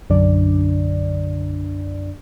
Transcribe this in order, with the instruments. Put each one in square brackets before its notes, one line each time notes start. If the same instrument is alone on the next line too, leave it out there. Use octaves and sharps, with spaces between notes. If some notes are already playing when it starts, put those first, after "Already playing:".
[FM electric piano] B1 F#2 D3 D4 D5